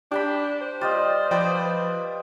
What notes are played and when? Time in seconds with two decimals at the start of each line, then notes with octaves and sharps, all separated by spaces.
0.11 D4 G4 G5 B5
0.62 C5
0.81 G3 F4 D5 D#5
1.31 F3 B4 D5 D#5 G5 D6